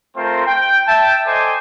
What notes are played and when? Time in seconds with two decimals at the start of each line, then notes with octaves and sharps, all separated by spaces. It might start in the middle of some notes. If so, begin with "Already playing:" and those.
0.16 A3 C4 F4 A#4 C5 C6
0.46 G5
0.88 E5 G5 A5
1.26 A4 C5 D5 D#5 G5 G#5